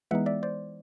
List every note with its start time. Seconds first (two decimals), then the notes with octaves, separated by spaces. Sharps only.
0.11 E3 G#3 B3 D#4 E5 F#5
0.26 D5 E5
0.43 C5 D5